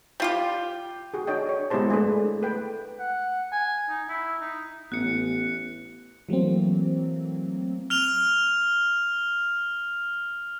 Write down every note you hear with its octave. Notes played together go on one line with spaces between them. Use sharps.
G3 F4 G4
F#4 G#4
D4 C#5 D#5 G5
C#5
G#3 B3 E4 G4 C5 A5
G#3 A3 D4 B4
A3 B4 G5
F#5
G#5
D#4
E4
D#4
A1 B3 F#6 C#7
E3 F#3 A3 A#3 C4
F6 F7 G7